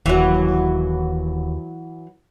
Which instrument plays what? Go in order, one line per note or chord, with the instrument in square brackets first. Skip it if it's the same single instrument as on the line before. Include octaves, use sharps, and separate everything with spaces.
[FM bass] D#1 [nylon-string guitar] D#2 [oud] E3 F#3